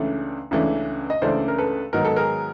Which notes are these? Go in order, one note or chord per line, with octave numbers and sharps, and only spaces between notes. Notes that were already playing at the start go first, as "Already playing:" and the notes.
Already playing: C#2 C#3 E3 A3 D4
C#2 C#3 E3 A3 D4
D#5
C#2 C#3 E3 A3 D4 C5 D5
A#4
A4 B4
G#2 D#3 F#3 B3 D#4 A#4
A4
G#4 A#4